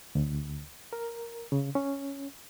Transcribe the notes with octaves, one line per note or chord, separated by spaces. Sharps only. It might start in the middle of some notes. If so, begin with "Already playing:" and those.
D2
A#4
C#3
C#4